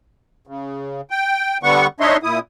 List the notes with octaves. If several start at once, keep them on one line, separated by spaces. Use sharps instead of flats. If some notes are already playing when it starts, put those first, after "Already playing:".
C#3
G5
D3 G3 B3 F#5 C#6
D4 D#4 C#5 D#5 E5 C6
A#2 E4 D#6